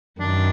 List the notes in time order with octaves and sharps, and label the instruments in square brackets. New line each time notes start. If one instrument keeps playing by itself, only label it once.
[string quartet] F#2 D#3 [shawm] D4